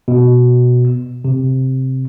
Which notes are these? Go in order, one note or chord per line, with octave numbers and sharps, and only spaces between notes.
B2
C3